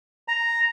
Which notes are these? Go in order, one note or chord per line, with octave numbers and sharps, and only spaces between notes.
A#5